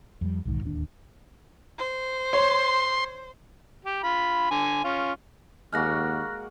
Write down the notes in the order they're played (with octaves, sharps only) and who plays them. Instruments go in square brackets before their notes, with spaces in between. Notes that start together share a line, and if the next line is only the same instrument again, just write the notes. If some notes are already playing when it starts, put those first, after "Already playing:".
[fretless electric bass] F2 G3
B1 E2 G#2 D#3
D1 D#2 C#4 D4
[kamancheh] C5
[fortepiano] C#5 [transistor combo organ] C6
[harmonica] G4
F4 B5
D3 G#5
C#4 F4
[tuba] D#2 [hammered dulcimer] G#3 A#3 F#4 [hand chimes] F6 F#6 A#6